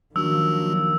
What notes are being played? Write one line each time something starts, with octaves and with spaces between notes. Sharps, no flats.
D#3 F3 F#3 A#3 D4 F#4 E6